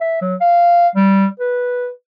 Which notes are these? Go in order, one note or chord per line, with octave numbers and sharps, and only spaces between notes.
E5
F#3
F5
G3
B4